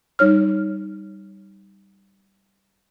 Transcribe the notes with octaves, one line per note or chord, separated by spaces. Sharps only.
G3 D#4 C#5 F6